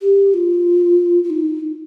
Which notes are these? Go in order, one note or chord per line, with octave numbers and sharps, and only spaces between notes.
G4
F4
F4
D#4